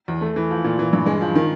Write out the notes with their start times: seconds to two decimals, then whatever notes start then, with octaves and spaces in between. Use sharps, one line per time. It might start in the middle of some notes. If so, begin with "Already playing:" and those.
0.08 E2
0.21 A3
0.36 E3
0.50 F3
0.64 A#2
0.79 E3
0.93 G2
1.06 G#3
1.21 F3
1.35 D#3